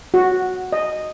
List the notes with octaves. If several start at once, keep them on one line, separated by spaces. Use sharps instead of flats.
F#4
D#5